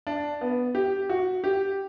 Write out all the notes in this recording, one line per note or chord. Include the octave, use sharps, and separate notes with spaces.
D4
B3
G4
F#4
G4